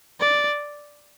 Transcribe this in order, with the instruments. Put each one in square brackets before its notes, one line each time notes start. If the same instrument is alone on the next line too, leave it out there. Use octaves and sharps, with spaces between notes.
[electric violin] D5